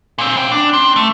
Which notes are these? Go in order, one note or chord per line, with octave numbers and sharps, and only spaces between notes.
A#2 C4
B3 G5
D4
C4
A3